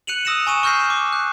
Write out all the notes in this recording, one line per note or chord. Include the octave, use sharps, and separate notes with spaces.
F#6 C#7 D#7 F7 F#7
D#6 E6 A#6 C#7 D#7 E7
G#5 C#6 D#7 E7
C#6 F6 G6 A#6 C7
D6
F#6